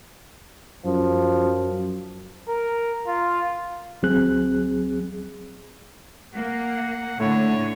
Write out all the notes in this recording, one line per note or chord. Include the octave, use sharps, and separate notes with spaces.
F#2 F3
A#4
F4
D2 F#3 C4 G#4 F#6
A#3 F#5
A2 D3 A3 E4 C#5 F#5